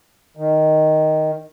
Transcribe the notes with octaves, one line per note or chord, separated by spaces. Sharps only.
D#3